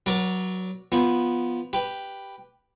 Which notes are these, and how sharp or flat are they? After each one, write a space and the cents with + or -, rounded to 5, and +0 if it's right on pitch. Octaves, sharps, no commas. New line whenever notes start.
F#3 +0 B4 -45 D5 +0
F3 +0 B3 -5
G4 +0 B4 +0